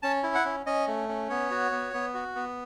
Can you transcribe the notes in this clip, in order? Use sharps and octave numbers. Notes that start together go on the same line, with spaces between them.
C#4 A5
E4
F#5
C#4
C#4 D#5
A3
C#4
B3 C#5
F#4
B3
B3
F#4
B3